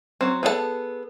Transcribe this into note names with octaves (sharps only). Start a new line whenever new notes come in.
F#3 C4
B3 G#4 A4 D#5 A5